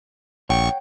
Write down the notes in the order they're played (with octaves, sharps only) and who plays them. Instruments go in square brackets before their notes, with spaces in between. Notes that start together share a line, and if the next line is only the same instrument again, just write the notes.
[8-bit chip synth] A#1 C#6 [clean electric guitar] C#5 F#5 G5